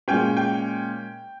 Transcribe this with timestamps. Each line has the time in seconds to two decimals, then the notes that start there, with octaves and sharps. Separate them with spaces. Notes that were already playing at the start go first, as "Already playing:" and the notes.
0.08 A#2 G#3 C#4 G5
0.37 G5